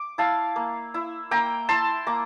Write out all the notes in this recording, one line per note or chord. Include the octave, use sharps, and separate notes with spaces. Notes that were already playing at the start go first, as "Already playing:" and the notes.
Already playing: D6
E4 F5 A5
A#3
E4
A#3 G5 A#5
E4 A5 C6
A#3 A#5 D6